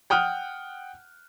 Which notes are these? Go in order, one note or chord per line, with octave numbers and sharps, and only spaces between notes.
F#5 G5 D#6 F6 F#6